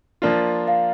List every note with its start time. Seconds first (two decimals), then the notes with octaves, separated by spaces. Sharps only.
0.22 F3 A#3 D4 F4
0.68 F5